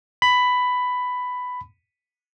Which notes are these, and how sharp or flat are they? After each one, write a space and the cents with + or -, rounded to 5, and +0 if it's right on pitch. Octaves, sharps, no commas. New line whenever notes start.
B5 +10